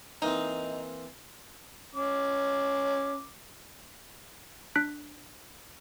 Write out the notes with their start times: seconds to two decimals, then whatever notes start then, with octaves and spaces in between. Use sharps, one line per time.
0.22 E3 A#3 C4 D#4
1.95 C#4 D6
4.75 D4 F#6 B6 D7